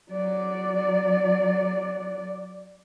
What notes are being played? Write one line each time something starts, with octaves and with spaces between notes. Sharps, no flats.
F#3 D5